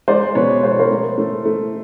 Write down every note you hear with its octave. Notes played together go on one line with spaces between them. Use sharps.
G#3 C5 D5
B2 B4 C#5
G#3 C5
C#5
A#4 C5
A3
A3
A3